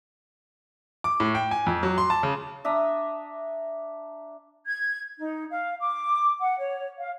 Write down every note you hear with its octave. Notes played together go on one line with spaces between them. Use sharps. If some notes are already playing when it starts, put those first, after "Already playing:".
D6
A2
G5
G#5
F2
F#3
C6
A5
C#3
D4 E5 A#5 D#6
G#6
D#4
F5
D6
F#5
C#5
F5